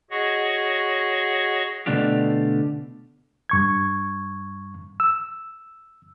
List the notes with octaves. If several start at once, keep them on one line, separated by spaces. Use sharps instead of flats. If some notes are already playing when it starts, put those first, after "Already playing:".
F#4 G#4 C#5 D#5 F#5 C#6
B2 D3 A3 D4 F4 G4
G2 C#6 G#6
E6